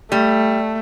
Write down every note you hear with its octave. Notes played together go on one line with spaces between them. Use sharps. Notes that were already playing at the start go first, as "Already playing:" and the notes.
G3 A3